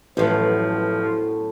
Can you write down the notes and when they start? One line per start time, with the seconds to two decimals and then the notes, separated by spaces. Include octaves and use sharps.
0.17 A1 F#2 A2 F3 B3